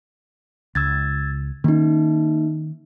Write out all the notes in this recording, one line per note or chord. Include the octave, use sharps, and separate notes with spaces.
C#2 E6 G#6 A6
D#3 A#3 C#4 D#4